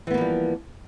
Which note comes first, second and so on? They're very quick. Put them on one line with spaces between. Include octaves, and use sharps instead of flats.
E3 B3 A#3 F3 G3